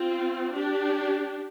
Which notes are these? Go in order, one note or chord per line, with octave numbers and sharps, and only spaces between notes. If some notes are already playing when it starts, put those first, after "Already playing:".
Already playing: C4 F4
D4 G4